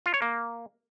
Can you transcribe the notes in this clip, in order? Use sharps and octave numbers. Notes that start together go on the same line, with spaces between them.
F4
C#5
A#3